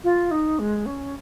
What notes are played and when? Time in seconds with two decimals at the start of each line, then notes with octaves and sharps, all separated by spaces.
0.04 F4
0.31 D#4
0.59 G#3
0.86 C#4